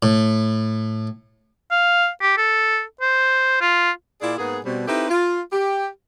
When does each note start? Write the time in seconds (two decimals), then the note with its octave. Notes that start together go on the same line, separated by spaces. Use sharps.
0.03 A2
1.71 F5
2.21 G4
2.37 A4
3.01 C5
3.61 F4
4.21 A#2 E4 F4 G#4 D5
4.38 G#2 A#3 B3 G#4
4.65 B2 G3 C4
4.88 C4 D#4 E4 G4 A4 B4
5.09 F4
5.52 G4